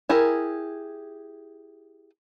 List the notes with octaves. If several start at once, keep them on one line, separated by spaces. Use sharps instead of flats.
E4 G4 G#4 A#4